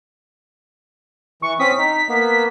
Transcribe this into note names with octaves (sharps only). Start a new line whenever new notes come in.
E3 C#6
C4 C#4 D#6 B6
D#4
A#3 B3